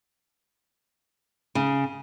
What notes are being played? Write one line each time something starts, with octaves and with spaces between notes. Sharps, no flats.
C#3